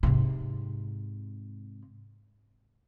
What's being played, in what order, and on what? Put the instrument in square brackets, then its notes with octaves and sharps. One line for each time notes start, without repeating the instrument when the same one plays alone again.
[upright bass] G#2 C3